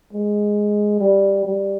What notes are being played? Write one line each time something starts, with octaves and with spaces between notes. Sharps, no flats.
G#3
G3
G3